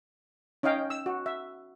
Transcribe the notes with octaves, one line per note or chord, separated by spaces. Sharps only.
C#4 D#4 D#5 F5 G5
E6
F#4
E5